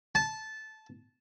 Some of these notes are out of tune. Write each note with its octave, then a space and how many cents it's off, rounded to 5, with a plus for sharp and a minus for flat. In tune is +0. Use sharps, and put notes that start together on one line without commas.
A5 -15